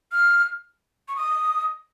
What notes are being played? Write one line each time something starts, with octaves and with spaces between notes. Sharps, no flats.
F6
C#6
D#6